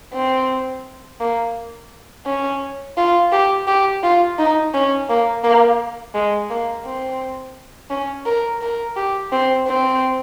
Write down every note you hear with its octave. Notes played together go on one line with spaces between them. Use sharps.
C4
A#3
C#4
F4
G4
G4
F4
D#4
C#4
A#3
A#3
G#3
A#3
C4
C#4
A#4
A#4
G4
C4
C4